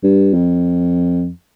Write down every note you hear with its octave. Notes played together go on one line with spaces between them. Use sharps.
G2
F2